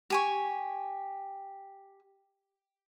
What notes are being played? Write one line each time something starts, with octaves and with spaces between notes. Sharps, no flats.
G4 G#5 C#6